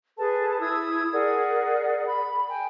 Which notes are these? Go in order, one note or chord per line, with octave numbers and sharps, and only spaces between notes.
G#4 A4 B4 A5
E4 D#6 E6 G#6
G#4 A#4 D5 F#5
B5
G5 G#5